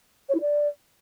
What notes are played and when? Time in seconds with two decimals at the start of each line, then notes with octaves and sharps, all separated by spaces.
0.28 C#5
0.34 E4
0.40 D5